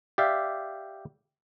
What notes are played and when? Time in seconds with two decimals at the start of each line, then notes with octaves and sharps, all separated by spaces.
0.18 G4 D5 E5 F5